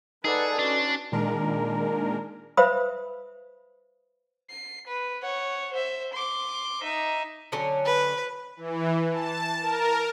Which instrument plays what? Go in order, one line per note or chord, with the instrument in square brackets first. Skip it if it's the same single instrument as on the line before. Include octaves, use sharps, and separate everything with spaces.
[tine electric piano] D#4 A4 D5 [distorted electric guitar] G#4 [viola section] B4 F#5 A5
[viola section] C#4 F#4 B4 [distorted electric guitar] D4
[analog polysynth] A#2 D#3 G#3 D4 A#4
[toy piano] B4 C5 E5 F5 B5 D#6
[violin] C7
B4
C#5 F#5
C5 E5
C6 D6
D#4 E5
[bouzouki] D3 F#3 C#4
[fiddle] B4
[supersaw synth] E3
A5
A#4